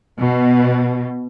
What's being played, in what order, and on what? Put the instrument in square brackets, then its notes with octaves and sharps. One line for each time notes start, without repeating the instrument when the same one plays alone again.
[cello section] B2